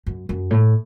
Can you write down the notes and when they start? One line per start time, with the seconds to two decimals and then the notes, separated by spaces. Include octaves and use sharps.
0.07 F#2
0.29 F#2
0.51 A2